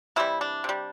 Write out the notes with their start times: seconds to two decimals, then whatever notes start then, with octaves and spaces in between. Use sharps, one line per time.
0.16 C3 E3 G3 E4
0.41 D4
0.64 C3 G3